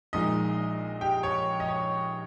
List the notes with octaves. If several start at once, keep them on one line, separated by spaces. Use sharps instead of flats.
A#1 A#2 G#3 D#4 D#5
G4 G5
C#5
D#5
C#5